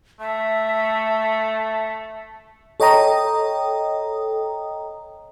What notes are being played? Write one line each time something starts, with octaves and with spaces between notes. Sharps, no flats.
A3 E5
A4 C#5 D#5 G5 A#5 D#6